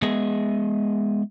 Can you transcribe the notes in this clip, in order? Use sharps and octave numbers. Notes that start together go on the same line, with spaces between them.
G#3 B3 G#4 D#5 E5